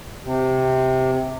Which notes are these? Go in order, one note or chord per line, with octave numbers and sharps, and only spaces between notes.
C3